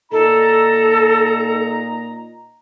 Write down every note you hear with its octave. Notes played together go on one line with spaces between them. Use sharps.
A#2 D#4 A4 A#5